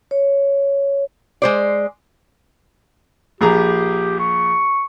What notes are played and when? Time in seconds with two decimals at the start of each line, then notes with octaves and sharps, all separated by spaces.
0.11 C#5
1.42 G#3 C5 D5
3.41 A#1 G4 G#4 A#5
4.19 C#6